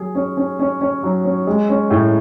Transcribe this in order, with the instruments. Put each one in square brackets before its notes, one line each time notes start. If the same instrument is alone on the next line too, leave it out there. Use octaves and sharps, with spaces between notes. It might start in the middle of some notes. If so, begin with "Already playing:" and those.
Already playing: [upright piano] F#3 G#4
C#4
C#4
C#4
C#4
F#3
C#4
G#3
C#4
A2